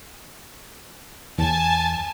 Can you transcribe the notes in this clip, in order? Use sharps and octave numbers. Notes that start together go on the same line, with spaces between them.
E2 G#5 A5